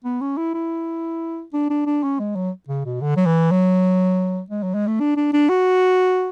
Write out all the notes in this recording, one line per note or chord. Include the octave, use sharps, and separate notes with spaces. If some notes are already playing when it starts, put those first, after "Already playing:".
B3
C#4
E4
E4
D4
D4
D4
C#4
G#3
F#3
C#3
B2
D3
F#3
E3
F#3
G#3
F#3
G#3
A3
D4
D4
D4
F#4